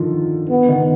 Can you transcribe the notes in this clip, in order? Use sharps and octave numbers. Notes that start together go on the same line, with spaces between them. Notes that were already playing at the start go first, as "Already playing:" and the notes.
Already playing: D3 D#3 F3
B3
D#3